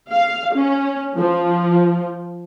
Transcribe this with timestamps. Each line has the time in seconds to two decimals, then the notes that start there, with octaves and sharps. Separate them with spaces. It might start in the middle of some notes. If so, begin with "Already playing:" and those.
0.11 F5
0.55 C#4
1.17 F3